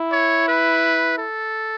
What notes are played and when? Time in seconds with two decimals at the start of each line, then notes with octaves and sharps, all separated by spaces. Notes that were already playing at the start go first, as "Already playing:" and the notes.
Already playing: E4
0.12 C#5
0.48 B4
1.18 A4